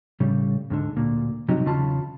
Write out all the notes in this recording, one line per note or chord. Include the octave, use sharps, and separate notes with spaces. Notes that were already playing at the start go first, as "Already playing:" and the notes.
A2 C#3 G3
D2 G#2 D3
D2 A#2
G2 C3 F#3 D#4 G4
E2 C#3 F4 A5 B5